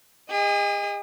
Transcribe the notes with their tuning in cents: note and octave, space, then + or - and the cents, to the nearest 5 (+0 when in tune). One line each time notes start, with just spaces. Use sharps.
G#4 -40 D#5 +0